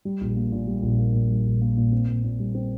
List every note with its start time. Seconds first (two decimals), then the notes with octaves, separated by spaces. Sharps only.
0.05 G3
0.21 A#1
0.37 A#3
0.52 A#2
0.67 G3
0.83 A#1
0.98 A#3
1.14 A#2
1.30 G3
1.46 A#1
1.61 A#3
1.77 A#2
1.92 C4
2.08 A#2
2.24 A#2
2.39 G3
2.55 C4